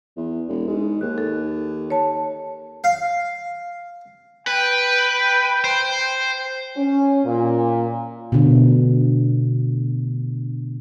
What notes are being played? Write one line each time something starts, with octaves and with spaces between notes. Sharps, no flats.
E2
E1
G#2
D#2 F#6
A4
C#5 A5
F5
B4 G5
C5
C#4
A#2
B2 D3